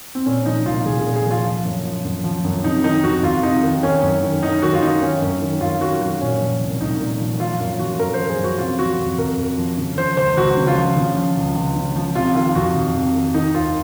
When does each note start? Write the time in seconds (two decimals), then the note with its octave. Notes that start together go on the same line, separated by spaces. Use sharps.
0.15 C4
0.26 A#2 C#4
0.46 F3 D#4
0.66 C2 F4
0.86 C2 G#4
1.01 A#2 G#4
1.16 G#4
1.26 F3 F4
1.45 F3
1.65 F#2
1.85 F3
2.05 F#2
2.24 F3
2.44 F#2
2.64 C3 D#4
2.84 D#3 D#4
3.04 F2 F#4
3.23 F2 F4
3.43 C3 D#4
3.63 D#3
3.83 D#3 C#4
4.03 F#2
4.23 D#3
4.43 F#2 D#4
4.62 D#3 F#4
4.74 F4
4.82 F#2 D#4
5.02 D#3 C#4
5.22 F#2
5.42 D#3
5.61 F#2 F4
5.81 D#3 F#4
6.01 F#2 F#4
6.21 A#2 C#4
6.41 F3
6.61 C2
6.80 C2 D#4
7.00 A#2
7.20 F3
7.40 F3 F4
7.60 F#2 F4
7.79 F3 F#4
7.99 F#2 A#4
8.14 C5
8.19 F3
8.29 G#4
8.39 F#2
8.44 F#4
8.58 C3 F4
8.79 F3 F#4
8.99 F2
9.18 F2 A#4
9.38 C3
9.58 F3
9.78 C#3
9.98 F3 C5
10.17 C#2 C5
10.37 C#2 F#4
10.57 C#3
10.67 F4
10.77 F3
10.96 C#3
11.17 F3
11.37 C#2
11.56 C#2
11.76 C#3
11.96 F3
12.15 C3 F4
12.35 D#3 F4
12.55 F2 F#4
12.75 F2
12.95 C3
13.15 D#3
13.34 D#3 D#4
13.54 D#2 F4